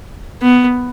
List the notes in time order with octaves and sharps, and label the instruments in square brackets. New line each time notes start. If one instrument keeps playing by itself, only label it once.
[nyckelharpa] B3